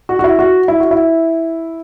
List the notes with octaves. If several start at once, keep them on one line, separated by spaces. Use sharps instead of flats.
F#4
F#4
E4
F#4
E4
F#4
E4